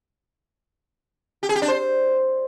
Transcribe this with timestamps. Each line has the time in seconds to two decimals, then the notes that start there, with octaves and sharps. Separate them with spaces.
1.43 G4
1.49 G#4
1.56 G4
1.62 D4
1.68 C5